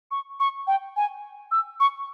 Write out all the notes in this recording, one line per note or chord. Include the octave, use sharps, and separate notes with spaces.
C#6
C#6
G5
G#5
E6
C#6